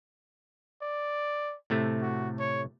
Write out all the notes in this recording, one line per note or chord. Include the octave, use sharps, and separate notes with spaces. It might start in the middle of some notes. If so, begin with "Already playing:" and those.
D5
A2 C3 A3
F#4
C#5